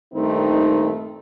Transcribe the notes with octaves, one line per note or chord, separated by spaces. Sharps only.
G2 A#2 D#3 A3 C4 D#4